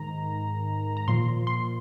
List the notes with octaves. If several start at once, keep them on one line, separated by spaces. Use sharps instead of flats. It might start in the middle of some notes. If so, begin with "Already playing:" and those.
Already playing: G#2 D#3 A#5
A#5
A#2 F3 C6
C6